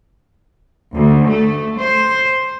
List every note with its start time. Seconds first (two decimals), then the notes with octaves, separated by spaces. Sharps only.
0.93 D2
1.26 A3
1.76 C5